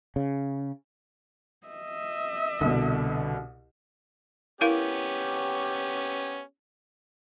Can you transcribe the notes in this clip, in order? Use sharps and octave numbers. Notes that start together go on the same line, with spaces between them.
C#3
D#5 E5
C2 B2 D3
B3 C#4 E4 G4 A#4 F5